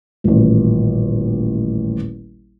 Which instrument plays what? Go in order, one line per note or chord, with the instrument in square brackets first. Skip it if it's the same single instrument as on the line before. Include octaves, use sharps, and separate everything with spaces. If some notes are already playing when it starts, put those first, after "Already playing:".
[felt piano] D#1 A1